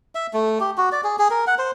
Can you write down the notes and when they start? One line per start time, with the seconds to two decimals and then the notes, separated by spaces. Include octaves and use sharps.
0.15 E5
0.33 A3
0.60 G4
0.78 F#4
0.92 D5
1.04 G#4
1.19 G#4
1.30 A#4
1.47 F#5
1.58 C5